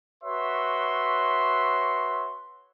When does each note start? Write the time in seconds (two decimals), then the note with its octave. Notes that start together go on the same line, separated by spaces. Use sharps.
0.24 F#4 B4 C#5 E5 C6